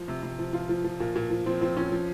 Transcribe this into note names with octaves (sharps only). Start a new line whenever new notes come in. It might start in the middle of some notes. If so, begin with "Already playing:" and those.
Already playing: F3
C3
C3
F3
F3 F4
F3
F3
A#2
A#2
F3
F3 C4
F3 C4
F3 C#4
F3